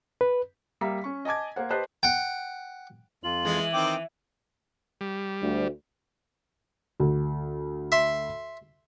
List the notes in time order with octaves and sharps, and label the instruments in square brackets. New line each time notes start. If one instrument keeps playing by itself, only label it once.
[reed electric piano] B4
[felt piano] G3 A#3 E5 A#5 B6
C#4 C#6
D#5 G#5 A5 D6 G#6
A#3 C5 F#5
G4 B4 C5 D#5 A5 F#6
[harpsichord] F#5 G5
[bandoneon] F2 F4 [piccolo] F#7
[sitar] E3 [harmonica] G#3
[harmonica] D#3 C4 D6 [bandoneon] G5
[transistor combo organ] G3
[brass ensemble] D2
[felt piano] D2
[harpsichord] E5 C6